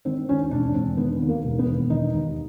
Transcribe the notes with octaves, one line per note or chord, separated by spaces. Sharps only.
D#3 C4
D#2 C#4
E1 D4
E1 C4
D#3 B3
D#2
A#3
E1
B3
E1
D#3 D#4
D#2